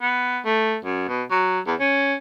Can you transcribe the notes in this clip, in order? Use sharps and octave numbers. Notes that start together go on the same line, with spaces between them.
B3
A3
F#2
B2
F#3
E2
C#4